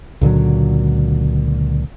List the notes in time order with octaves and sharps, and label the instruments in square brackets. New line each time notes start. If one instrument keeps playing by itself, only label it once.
[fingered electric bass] C#2 A#2 D3 F#3